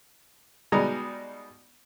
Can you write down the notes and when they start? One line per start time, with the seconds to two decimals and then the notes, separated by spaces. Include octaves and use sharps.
0.72 B2 G3 G#3 D#4 G#5 A#5